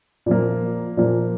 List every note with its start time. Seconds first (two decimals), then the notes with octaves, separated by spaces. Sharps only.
0.26 A#2 F3 A#3
0.97 A#2 F3 A#3